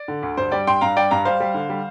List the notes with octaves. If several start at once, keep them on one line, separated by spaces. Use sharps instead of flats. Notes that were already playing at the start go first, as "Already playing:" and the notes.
Already playing: D5
D3
D2
G2 C5
G3 D5 G5
G2 G5 C6
G2 F5 A#5
G3 D5 G5
G2 F5 A#5
G3 C5 F5
G3
D3
G3